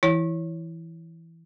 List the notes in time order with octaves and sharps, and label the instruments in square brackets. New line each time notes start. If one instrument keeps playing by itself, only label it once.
[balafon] E3 E4 C#5